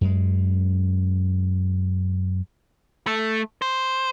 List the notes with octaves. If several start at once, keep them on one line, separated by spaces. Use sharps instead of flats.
F#2 G#3
A3
C5